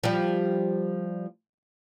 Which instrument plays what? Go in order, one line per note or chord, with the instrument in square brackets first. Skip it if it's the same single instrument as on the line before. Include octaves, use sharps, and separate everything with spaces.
[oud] F3 G3